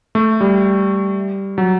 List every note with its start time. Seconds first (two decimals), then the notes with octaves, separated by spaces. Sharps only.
0.15 A3
0.41 G3
1.58 F#3